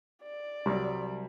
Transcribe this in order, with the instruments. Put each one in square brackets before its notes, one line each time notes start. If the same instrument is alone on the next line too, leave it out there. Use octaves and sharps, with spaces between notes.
[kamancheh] D5
[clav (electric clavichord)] C2 [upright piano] F#3 G3